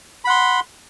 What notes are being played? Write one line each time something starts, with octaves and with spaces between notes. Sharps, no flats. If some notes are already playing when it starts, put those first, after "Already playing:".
F#5 B5 C6